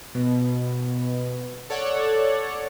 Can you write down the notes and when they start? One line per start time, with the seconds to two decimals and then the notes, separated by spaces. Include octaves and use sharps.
0.15 B2
1.70 A4 C#5 D5 F#5